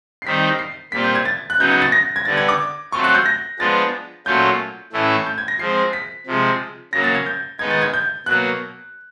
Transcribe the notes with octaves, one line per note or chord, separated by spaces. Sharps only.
C7
D#3 G3 C4 D#4 B6
C7
A#2 G3 C4 F4 B6
G6
G#6
A6
F#6
C#3 F#3 B3 D#4 G6
G#6
A6
A#6
G#6
D3 G3 B3 D4 A6
G#6
D6
F#3 A3 C4 F4 C#6
F#6
G6
A#6
F3 G#3 B3 D4 F4 A6
A#2 F#3 A3 C#4 F4 G6
A2 E3 A3 C#4 E4
G6
G#6
A#6
F3 G#3 C4 C7
B6
C3 F3 G#3
C#3 F#3 A#3 A#6
A6
G#6
G6
D#3 G#3 B3 D#4 G#6
A6
G#6
G6
B2 F#3 A#3 F#6